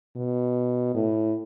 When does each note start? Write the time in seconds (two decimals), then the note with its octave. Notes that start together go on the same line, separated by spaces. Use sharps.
0.16 B2
0.95 A2